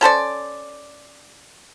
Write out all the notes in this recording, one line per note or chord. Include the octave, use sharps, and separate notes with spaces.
C#4 A4 C5 D5